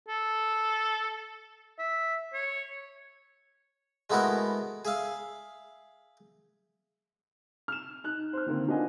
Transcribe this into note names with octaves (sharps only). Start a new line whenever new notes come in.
A4
E5
C#5
G#3 A3 B3 E4 F#4 A#4
G#4 E5 F5
F6 E7
D#4 F#6
C5 F6
D3 D#3 A#3 C4
B3 D4 F4 D#5 F#5 G#5